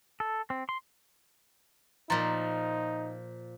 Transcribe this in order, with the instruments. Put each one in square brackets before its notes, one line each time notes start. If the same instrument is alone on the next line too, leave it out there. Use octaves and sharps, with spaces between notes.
[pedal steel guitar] A4
C4
C6
[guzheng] A#2 F3 [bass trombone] D#4 [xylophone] A#5 C6 A6